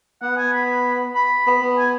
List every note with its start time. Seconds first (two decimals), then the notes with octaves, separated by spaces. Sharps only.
0.22 B3 F#5
0.38 G#5
0.53 B5
1.16 B5
1.47 B3
1.62 B3
1.78 G#5